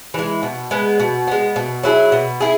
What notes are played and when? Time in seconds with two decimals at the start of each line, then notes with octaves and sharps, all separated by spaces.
0.14 E3 G#3
0.43 B2
0.71 G#3 B3
1.00 B2
1.28 G#3 B3
1.56 B2
1.83 F#3 E4 G#4
2.12 B2
2.40 E4 G#4